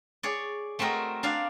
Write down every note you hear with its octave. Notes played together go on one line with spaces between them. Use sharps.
G#4 C#5 D5
A3 C4 F#4 A#4 D#5
D4 D5 F5 G#5